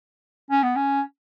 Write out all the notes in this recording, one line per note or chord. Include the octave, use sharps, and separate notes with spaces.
C#4
B3
C#4